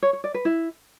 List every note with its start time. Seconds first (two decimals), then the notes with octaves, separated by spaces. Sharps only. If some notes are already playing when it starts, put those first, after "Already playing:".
0.03 C#5
0.13 C#5
0.24 D5
0.34 B4
0.45 E4